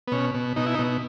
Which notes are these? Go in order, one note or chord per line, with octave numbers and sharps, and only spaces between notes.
B3
B2 C#4
B2
B2 D#4
E4
D#4
B2